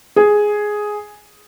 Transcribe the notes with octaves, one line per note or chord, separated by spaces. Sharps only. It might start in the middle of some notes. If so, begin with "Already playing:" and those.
G#4